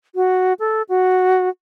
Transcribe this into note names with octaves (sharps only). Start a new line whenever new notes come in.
F#4
A4
F#4